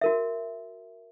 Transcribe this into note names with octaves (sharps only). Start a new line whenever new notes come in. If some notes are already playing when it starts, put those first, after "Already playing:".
F#4 A#4 E5